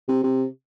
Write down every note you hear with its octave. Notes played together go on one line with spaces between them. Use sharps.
C3
C3